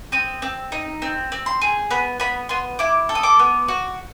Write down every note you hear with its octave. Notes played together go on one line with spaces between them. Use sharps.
C4 D#6
C4
D#4
C4
C4
C6
G#4
B3 B5
B3 B5
B3 C6
E4 D6
A4
D#6
D6
B3
F#4